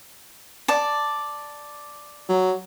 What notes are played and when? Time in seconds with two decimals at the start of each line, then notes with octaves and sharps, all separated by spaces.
0.68 D5 A5
2.29 F#3